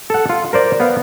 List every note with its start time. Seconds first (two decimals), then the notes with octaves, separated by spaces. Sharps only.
0.10 A4 F#5
0.29 F4
0.53 A#4 C5 D5
0.80 B3 F5